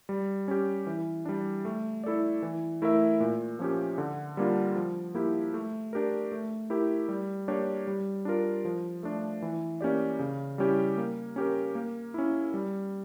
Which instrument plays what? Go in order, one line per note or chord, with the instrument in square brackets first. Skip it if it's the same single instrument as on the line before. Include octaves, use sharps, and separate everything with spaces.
[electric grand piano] G3
C#4 G4
E3
G3 D4
A3
E4 A4 D5
E3
A3 E4 A#4 E5
A#2
F3 A#3 C#4 G4
D3
G3 A#3 D4 F4
F3
A#3 E4 G4
A3
D4 G4 A#4
A3
E4 G4 A#4
G3
A#3 D4 G4 C#5
G3
D4 F4 A#4
F3
A3 D4
E3
A#3 C#4 G4 D5
C#3
G3 C#4 E4 G4
A#3
C#4 G4 A#4
A#3
C#4 E4
G3